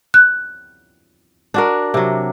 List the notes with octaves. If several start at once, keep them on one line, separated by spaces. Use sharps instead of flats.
F#6
D4 F#4 A#4
C3 F#3